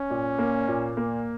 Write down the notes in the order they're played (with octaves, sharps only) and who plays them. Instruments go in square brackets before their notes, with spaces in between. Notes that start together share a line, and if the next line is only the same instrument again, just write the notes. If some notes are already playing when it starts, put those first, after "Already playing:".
Already playing: [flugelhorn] C#4
[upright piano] A#2
A#3
A#2
A#3